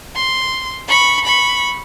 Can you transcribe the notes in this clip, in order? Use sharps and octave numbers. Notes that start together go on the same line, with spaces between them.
C6
B5 C#6
B5 C#6